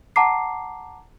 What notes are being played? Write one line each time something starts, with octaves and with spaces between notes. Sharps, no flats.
F#5 A5 A#5 D6 C7